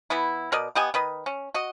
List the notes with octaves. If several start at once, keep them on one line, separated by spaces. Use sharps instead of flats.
E3 B3 E4
B2 A#4 D5 D#5
B3 G4 D#5 G#5
D#3 B4 D#5
C#4
F#4 D#5